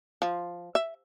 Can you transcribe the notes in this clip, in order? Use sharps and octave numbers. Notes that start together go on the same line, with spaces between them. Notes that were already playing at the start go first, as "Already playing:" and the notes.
F3
E5